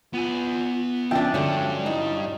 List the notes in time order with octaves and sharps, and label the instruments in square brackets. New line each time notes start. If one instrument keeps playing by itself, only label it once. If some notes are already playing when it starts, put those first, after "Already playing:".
[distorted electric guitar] B3 G#5 [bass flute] F4
[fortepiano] F3 E5 G5 [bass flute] C#4 [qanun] D4 D#5 A5
[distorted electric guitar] G2 D4 [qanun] D3 F#3 C#4 [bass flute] G#3
[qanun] D#4 [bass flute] E4